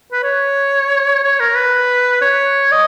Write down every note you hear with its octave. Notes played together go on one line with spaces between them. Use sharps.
B4
C#5
C#5
A#4
B4
C#5
D#5